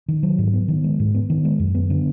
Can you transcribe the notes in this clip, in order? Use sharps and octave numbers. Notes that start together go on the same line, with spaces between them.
D#3
F#3
G#2
B3
D#3
G#3
G#2
B3
D#3
G#3
F#2
B3
D3